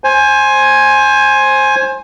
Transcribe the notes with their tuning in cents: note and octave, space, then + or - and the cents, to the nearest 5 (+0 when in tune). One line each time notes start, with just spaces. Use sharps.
C5 +20 G#5 +5